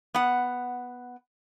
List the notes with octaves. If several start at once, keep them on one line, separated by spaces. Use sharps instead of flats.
B3 F#5